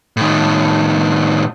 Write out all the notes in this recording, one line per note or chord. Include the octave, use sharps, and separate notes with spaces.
A2 D#3